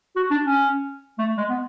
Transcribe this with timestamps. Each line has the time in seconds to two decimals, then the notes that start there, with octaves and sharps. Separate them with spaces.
0.16 F#4
0.30 D4
0.45 C#4
1.18 A3
1.37 G#3
1.49 B3